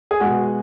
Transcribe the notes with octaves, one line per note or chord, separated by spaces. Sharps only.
G#4
B2 G#3 F#4